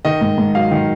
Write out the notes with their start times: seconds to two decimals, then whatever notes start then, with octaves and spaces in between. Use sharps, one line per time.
0.05 D#3 D#5
0.21 G#2
0.38 G#2
0.55 F#3 F5
0.71 D#3